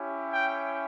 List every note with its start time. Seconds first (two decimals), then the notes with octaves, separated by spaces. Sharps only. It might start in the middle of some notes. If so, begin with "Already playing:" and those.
Already playing: C#4 E4 G4
0.33 G5